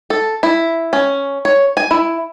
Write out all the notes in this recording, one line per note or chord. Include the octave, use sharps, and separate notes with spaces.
A4
E4
C#4
C#5
G#5
E4